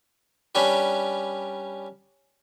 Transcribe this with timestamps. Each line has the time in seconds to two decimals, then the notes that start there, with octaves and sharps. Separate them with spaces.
0.55 G3 C#4 D4 G4 B4